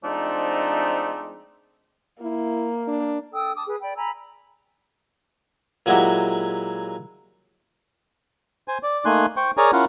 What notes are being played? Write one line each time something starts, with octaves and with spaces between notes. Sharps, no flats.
F3 G#3 A3 C4 D4 D#4
A#3 E4
D4
A4 G5 D#6 E6
A5 D6 D#6
G#4 B4
D5 G5 B5
G#5 A#5 B5 E6
A#2 F#3 G#3 E4 F#4 G4
C5 G#5
D5
A3 A#3 D#4 G#5 C6 F#6
C5 G5 C#6
G#4 A#4 C#5 D5 G#5 A#5
C#4 E4 F4 A#4 F5 F#5